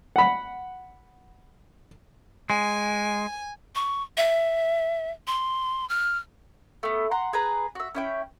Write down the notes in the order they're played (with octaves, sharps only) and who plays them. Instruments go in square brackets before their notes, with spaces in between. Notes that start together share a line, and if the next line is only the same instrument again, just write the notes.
[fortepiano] F#5 B5
[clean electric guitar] G#3 [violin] G#5
[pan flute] C#6
E5
C6
F6
[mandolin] A3 B3
F#5 A#5 C6
G#4 B4 A#5
F#4 E5
C#4 E4 G5